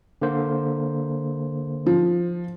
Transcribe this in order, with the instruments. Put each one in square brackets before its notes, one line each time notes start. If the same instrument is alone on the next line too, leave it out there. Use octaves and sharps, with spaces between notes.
[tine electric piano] D3 A#3 C5
[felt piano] F3